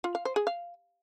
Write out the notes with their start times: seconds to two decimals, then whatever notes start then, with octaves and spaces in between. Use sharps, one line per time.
0.04 F4
0.15 F5
0.25 C5
0.36 G#4
0.47 F5